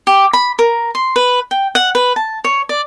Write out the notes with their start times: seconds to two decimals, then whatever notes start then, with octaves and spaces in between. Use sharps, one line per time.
0.07 G4
0.33 B5
0.59 A#4
0.95 C6
1.16 B4
1.51 G5
1.75 F#5
1.95 B4
2.16 A5
2.44 C#5
2.69 D5